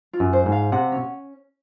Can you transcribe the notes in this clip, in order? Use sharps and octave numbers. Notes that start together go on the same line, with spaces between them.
F4
F#2
C5
G#2
F5
C3 F#5
C#4